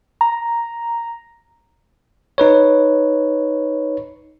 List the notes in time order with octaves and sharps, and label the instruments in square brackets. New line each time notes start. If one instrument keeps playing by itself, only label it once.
[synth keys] A#5
[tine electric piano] D#4 B4 C#5